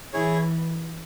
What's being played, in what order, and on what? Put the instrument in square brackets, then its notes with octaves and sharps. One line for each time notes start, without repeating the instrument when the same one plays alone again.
[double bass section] E3 [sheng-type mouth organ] E4 G#4 C#5